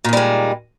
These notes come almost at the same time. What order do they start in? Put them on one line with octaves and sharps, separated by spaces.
A#2 D#3 G3 G#3